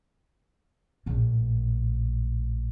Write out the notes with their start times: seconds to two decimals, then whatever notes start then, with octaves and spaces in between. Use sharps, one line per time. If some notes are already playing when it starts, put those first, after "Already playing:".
1.06 A#1 A2